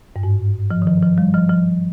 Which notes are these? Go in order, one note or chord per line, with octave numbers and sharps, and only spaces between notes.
G2
G#2
F3
D#3
F3
F3
G3
F3
F3